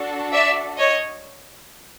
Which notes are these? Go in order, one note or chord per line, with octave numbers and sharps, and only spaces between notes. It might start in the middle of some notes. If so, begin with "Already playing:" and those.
Already playing: D4 F#4 A4
D5 E5
C#5 D#5